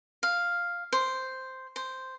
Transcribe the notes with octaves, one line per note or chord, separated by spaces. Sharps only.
F5
C5
C5